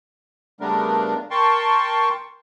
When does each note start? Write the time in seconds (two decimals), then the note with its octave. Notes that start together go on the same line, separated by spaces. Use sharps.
0.61 C#3 G3 A3 B3 D4 A#4
1.31 A#4 G5 A5 C6 C#6